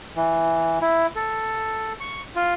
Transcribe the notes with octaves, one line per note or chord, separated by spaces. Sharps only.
E3
E4
A4
C#6
F4